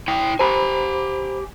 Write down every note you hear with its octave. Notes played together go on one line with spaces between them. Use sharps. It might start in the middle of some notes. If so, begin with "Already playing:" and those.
E4 G5
G4 C5 G#5 A#5 B5